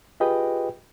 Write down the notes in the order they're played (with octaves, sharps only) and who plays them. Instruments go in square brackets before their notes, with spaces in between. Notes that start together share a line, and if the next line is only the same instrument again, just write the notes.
[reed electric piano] F4 G4 G#4 B4 D#5 G5